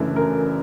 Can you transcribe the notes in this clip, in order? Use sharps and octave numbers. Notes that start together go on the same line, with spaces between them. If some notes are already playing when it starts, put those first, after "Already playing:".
Already playing: F#2 C#3 E3 A3 D4
A#4